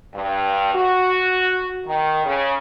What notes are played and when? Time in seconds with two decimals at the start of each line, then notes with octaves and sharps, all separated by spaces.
0.14 G2
0.75 F#4
1.86 D#3
2.25 C#3